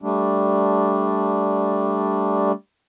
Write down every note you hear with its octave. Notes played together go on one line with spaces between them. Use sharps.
G3 A3 D4